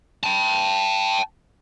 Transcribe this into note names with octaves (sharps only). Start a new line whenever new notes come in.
G5 A5